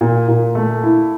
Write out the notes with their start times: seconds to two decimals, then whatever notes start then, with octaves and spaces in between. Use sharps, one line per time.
0.01 A#2
0.28 A#2
0.55 A3
0.83 E4